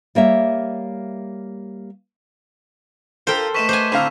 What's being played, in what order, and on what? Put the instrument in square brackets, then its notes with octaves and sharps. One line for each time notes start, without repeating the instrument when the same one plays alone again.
[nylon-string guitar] G3 A#3 C#5 E5
[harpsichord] F4 G4 A#5 [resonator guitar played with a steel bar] A4 A#4 [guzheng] C5 G5
[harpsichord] A3 D#4 B4 [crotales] C#6 B6 E7
[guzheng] C5 F#5 G#5 [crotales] D6
[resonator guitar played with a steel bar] A2 D3 F5 [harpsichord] C4 A#5